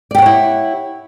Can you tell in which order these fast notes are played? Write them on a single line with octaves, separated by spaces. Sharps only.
D5 G4 F#5 C#5 E4